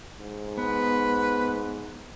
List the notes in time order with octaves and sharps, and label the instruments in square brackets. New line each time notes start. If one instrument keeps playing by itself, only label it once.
[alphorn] G#2
[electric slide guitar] B3 [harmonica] B4